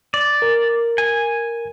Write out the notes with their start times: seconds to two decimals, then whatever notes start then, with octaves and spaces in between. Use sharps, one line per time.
0.14 D5
0.42 A#4
0.98 G#5